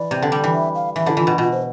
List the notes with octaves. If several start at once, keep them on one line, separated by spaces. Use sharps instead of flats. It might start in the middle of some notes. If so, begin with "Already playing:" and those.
Already playing: E3 D5
C3
D3
G3
E3
E5
F5
E3 E5
D3 E4
E3 F4
B2
B2 F4
C5